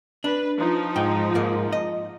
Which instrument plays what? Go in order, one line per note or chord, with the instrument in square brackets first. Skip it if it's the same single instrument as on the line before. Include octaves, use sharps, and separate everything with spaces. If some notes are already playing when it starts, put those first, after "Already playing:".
[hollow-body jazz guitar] D4 [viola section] B4
[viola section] F3 D#4
[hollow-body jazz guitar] G#2 G5
G#2 A#3
D#5